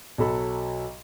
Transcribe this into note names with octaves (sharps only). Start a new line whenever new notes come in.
B1 F#3 A4 B5